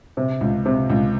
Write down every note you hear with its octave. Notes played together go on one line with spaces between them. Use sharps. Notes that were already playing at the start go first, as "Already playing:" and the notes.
C3
C#2
C3
C#2